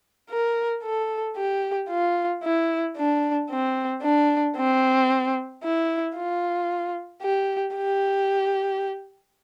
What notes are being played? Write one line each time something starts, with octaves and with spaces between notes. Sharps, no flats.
A#4
A4
G4
F4
E4
D4
C4
D4
C4
E4
F4
G4
G4